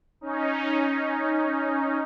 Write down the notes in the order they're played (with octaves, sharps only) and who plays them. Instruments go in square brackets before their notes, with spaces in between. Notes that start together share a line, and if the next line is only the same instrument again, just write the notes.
[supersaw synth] C#4 D#4